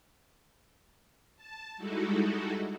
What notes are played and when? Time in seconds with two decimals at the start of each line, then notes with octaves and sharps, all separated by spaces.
1.36 A5
1.77 G3 G#3 D#4 E4 F#4 A4